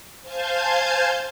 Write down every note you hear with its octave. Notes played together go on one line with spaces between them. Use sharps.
C5 F5 G#5 A5 G6 G#6